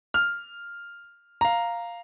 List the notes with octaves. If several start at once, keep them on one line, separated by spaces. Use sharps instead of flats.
F6
F5 A#5